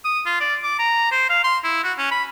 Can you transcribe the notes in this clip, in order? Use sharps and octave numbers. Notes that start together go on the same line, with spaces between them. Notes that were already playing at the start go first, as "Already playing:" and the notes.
D#6
F4
D5
D6
A#5
C5
F5
C6
E4
F#4
C#4
B5